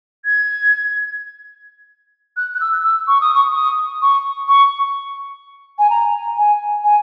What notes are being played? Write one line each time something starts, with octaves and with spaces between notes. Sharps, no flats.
G#6
F#6
F#6
E6
E6
C#6
D#6
C#6
D#6
C#6
C#6
G#5
A#5
G#5
G#5